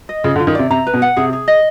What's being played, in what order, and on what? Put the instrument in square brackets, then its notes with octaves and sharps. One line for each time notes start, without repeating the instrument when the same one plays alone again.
[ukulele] D#5
[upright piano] C#3 [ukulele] F4
[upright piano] D3
[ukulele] F4
[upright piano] D#3
[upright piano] C3 [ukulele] D5
[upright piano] C3 [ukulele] A#5
[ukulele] B4
[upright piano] B2
[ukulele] F#5
[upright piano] C3 [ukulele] G#4
[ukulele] G#4
D#5